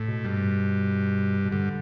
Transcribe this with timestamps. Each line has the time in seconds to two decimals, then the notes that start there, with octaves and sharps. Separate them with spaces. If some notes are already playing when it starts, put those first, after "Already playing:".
Already playing: A2
0.08 B2
0.24 G2
1.45 B2
1.51 G2 D3